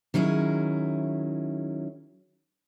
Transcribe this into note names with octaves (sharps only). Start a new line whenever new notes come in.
D#3 F#3 C#4 E4 G#4